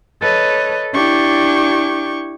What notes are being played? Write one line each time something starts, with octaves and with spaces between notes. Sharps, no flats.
A4 B4 C#5 D#5
D4 E4 G4 C#6 G6